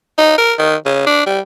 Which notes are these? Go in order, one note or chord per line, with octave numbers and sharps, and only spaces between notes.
D#4
A#4
D#3
C#3
D4
G3